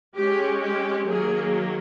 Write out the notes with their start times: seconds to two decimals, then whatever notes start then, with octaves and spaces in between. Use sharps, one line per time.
0.15 G#3 C#4 G4
0.61 G4
1.06 D#3 F#3 A#3 G#4